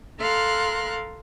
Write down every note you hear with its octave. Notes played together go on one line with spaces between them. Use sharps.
A4 A#4 F5 C6 F6 F#6